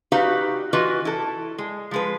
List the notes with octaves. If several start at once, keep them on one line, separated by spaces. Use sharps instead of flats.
D#4 F#4 G4 B4 E5 F5
E3 F4 F#4 B4 D#5
E4 A4
G#3
F3 G#3 B4